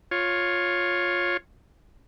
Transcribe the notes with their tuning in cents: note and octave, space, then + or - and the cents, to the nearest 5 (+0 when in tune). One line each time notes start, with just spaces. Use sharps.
F4 +15 C#5 +0